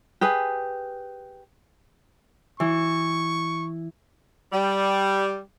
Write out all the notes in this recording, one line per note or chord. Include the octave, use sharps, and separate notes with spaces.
G4 G#4 B4 G#5
E3 C#6
G3